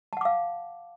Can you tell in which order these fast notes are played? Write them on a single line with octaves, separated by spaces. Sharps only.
A5 F#5 D6 F5